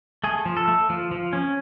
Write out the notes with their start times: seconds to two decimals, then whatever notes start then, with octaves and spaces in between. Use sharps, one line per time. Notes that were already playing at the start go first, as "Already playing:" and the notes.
0.24 A3 G#4
0.45 F3
0.57 A4
0.68 A3
0.90 F3
1.11 F3
1.33 C#4